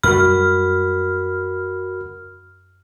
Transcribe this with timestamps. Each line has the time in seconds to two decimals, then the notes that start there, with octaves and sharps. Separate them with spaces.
0.03 F#2 G3 F#4 A#4 B5 F6